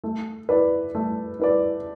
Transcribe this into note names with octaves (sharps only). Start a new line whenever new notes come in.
A3
E4 B4 D5
A3
E4 B4 D5